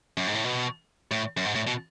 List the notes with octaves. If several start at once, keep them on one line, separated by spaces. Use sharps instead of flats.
F#2
G#2
A2
B2
A2
F#2
G#2
A2
B2